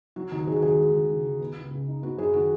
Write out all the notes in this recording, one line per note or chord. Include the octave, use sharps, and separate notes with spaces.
F#3 F#4
D#2 D#4
D#3 G#4
F#4
D#2 G#4
G#3
D#2
C#3
D#2
B3
C#2
C#3
D#4
B3 F#4
F#2 G#4
D#3 F#4